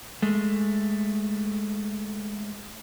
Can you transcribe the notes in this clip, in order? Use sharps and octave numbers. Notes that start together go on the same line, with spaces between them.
G#3 A3